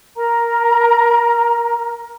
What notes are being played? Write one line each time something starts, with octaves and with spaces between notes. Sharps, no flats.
A#4 A#5